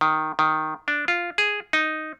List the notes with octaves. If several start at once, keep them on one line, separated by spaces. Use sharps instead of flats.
D#3
D#3
D4
F4
G#4
D#4